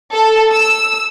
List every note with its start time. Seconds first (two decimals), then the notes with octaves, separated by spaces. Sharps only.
0.13 A4
0.52 E6